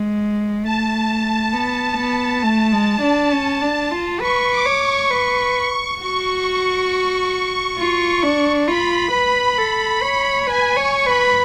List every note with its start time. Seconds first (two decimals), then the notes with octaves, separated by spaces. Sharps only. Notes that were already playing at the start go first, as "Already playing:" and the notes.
Already playing: G#3
0.64 A3 A5
1.53 B3
1.98 B3
2.42 A3
2.72 G#3
3.02 D4
3.32 C#4
3.62 D4
3.92 F4
4.20 B4 C#6
4.51 D6
4.66 C#5
4.81 C#6
5.10 B4
6.00 F#4 C#6
7.79 F4
8.23 D4
8.68 F4 B5
9.12 B4
9.57 A4
10.02 C#5
10.47 B4 G#5
10.76 C#5 C#6
11.06 B4 B5